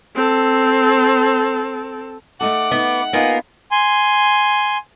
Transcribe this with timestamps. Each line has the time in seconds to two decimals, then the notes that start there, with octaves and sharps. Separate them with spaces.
0.15 C4 A4
2.41 A3 D#4 A4 F#5 D6
2.72 B3 D#4
3.13 A#3 B3 D#4 F4 G#5
3.71 G#5 C6